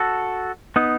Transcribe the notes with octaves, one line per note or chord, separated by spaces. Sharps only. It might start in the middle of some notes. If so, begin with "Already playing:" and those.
Already playing: F#4 A4
B3 D#4